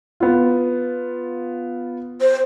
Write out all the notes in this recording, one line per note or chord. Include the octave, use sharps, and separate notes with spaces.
B3 F4
C5